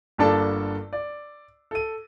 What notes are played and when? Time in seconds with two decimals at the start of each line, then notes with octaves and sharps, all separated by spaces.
0.18 G1 G2 A#3 D4 A4 A5
0.93 D5
1.71 A4 D#7